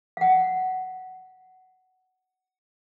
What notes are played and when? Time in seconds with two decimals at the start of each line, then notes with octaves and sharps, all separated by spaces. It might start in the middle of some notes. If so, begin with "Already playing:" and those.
0.17 F5 F#5